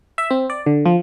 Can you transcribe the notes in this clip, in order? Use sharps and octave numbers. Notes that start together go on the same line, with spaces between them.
E5
C4
D5
D3
F3